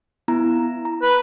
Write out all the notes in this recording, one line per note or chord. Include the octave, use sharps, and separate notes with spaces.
B3 E4 A#5
A#5
B4